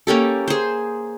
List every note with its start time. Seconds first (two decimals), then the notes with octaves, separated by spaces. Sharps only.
0.07 A#3 C#4 G4 A4
0.48 G#4 C5